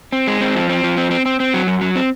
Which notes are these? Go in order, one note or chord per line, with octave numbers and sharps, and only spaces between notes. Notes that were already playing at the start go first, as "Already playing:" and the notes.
C4
G#3
C4
F3
C4
F3
C4
C4
C4
C4
F#3
F#2
F#3
C4